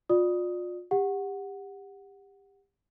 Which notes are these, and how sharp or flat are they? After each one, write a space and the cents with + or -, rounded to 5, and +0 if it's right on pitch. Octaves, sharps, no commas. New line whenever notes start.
F4 +35 D5 +20 D#6 +10
G4 +25 F#5 -5